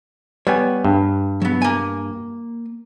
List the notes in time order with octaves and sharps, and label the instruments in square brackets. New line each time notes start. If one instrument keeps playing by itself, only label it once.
[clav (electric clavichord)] G3 B3 G#5 [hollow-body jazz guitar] C#5
[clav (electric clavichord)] G2
[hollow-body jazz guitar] F#3 B3
A#3 G#5